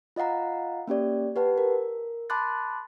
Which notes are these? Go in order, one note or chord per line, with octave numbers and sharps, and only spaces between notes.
F4 D#5 F5 F#5 A#5
A#3 C#4 G4 D5
G4 B4 F#5 A5
A#4
A5 B5 C6 D6 F#6 A6